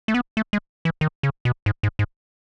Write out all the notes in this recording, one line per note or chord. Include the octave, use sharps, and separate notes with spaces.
A3
B3
A3
G#3
E3
D#3
C#3
B2
G#2
G#2
G#2